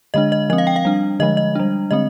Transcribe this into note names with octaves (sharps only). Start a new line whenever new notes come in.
D3 G#3 D4 D#5
D#5
F3 C4 D#5
F5
G5
F5
G3 D4
D3 F3 G#3 D#5
D#5
G3 D4
D3 G#3 C4 D#5